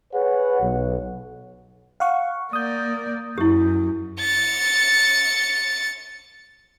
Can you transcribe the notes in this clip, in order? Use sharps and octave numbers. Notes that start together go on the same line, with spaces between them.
G#4 B4 C#5 F#5
B1
F5 F#5 C#6
A#3 D5 D#6 G6
F#2 E4 G4
A6 C#7